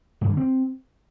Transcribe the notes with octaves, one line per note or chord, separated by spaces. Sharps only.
G2
D3
C4